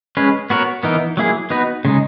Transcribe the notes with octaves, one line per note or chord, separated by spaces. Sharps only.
G#3 C#4 G#4 B4
B3 F#4 A#4 C#5
E3 B3 D#4 A#4
F#3 A#3 E4 G#4
B3 D#4 F#4 B4
C#3 G#3 D#4